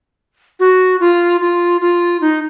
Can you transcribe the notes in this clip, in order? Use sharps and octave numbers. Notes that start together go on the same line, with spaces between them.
F#4
F4
F4
F4
D#4